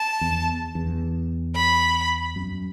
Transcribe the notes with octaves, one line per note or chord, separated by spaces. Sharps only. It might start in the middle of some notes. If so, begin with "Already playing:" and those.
Already playing: A5
E2
E2
B5
F#2